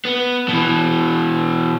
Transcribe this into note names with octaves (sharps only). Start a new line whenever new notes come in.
B3
B2 E3